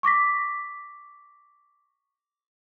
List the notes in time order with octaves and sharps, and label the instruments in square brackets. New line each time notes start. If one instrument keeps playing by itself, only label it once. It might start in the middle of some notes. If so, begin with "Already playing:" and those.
[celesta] C#6 D6 A#6 B6